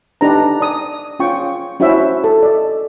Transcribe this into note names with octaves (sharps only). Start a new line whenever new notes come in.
D4 D#4 G4 B4 A#5
D5 D#6
C#4 F4 G5 C#6
C#4 E4 F#4 C5 E5
A4
D5 D#5